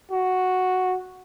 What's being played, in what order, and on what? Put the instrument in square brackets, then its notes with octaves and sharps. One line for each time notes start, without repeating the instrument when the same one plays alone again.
[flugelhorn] F#4